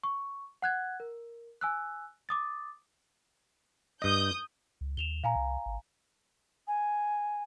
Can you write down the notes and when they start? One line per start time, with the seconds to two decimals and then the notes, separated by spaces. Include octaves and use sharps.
0.03 C#6
0.62 F#5 F#6 G#6
1.00 A#4
1.61 G#5 E6 F#6
2.29 D6 D#6 A6
4.02 G2 D#5 D#6 G6
4.81 C#2
4.97 D#2 E7 F7 G7
5.24 A#2 F5 G#5 A#5
5.36 C2
5.66 G#1
6.68 G#5